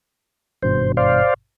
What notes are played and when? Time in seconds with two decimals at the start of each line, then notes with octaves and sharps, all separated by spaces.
0.63 G#1 G2 B2 C5
0.97 C5 D5 F5